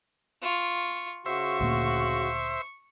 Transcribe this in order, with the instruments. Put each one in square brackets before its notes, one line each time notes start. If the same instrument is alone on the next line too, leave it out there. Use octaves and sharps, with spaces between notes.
[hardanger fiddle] F4 C#6
[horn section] C#3 F4 F#4 [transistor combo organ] C5 E5 [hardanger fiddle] C#6
[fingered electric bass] D2 A#2 A#3